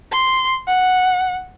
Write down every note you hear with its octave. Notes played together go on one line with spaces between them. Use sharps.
C6
F#5